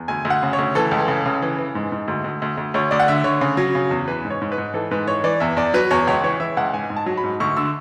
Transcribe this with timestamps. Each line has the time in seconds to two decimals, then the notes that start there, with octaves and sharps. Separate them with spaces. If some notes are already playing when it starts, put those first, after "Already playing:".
Already playing: E2
0.08 D2 G#5
0.25 D2
0.30 F#5
0.43 C#3
0.53 C#5
0.59 D2
0.75 E3 A4
0.91 C#2
1.08 C#3
1.26 C#3
1.42 E3
1.58 E3
1.75 G#2
1.92 G#2
2.08 D2
2.24 D2
2.42 D2
2.58 D2
2.74 D2 C#5
2.91 D2 D5
3.00 F#5
3.08 D3 E5
3.24 D3 C#5
3.41 C#3
3.57 F#3
3.75 C#3
3.91 E2
4.08 E3 B4
4.25 G#2
4.30 C#5
4.41 G#2
4.52 B4
4.58 G#2
4.74 E3 A4
4.91 G#2 B4
5.07 E3 C#5
5.24 E3 D5
5.40 E2 E5
5.57 E2 D5
5.74 F#3 B4
5.91 E2 C#5
6.07 C#2 C#5
6.23 E3 C#5
6.40 E3 E5
6.57 C#2 F#5
6.74 G#2 G#5
6.90 G#2
6.96 A5
7.06 F#3
7.17 B5
7.24 G#2
7.40 D2 C#6
7.57 D3 E6